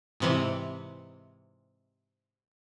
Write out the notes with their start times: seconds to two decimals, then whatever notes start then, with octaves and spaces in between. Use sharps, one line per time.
0.20 G#2 C3 E3